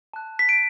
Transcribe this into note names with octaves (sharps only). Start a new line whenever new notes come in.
A5 F#6
B6
D7